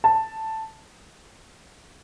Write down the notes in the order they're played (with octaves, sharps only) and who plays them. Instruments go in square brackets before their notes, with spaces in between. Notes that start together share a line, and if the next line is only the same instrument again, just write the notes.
[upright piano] A5